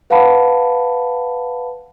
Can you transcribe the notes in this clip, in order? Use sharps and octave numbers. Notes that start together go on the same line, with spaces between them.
B4 F5 F#5 A5 B5